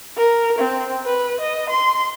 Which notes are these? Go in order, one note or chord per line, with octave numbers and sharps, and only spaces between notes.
A#4
C4
B4
D#5
C6